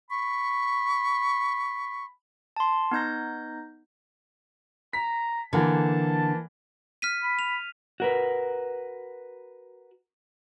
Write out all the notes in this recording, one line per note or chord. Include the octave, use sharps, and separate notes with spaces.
B5 C#6
A5 C6
B3 D#4 G6 A#6
A#5 B6
D3 E3 A#3 A5
F6 B6 D#7
B5
F7
F#4 A#4 B4